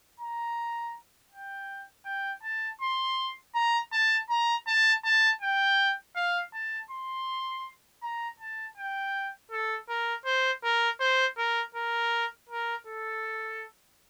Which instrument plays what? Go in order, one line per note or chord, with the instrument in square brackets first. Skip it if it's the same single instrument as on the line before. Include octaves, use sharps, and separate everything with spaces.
[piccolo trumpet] A#5
G5
G5
A5
C6
A#5
A5
A#5
A5
A5
G5
F5
A5
C6
A#5
A5
G5
A4
A#4
C5
A#4
C5
A#4
A#4
A#4
A4